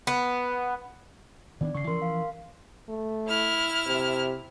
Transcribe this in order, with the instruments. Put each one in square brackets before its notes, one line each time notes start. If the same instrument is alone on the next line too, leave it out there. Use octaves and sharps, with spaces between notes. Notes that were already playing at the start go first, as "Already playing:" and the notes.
[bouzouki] B3
[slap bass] D#3 B3 D4 [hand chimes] D5
[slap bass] C#3 [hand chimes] C#6 C7
[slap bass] E3 F3 C#4 [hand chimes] A#4 C6
[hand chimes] F5
[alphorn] A3
[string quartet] E4 F6
[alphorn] C3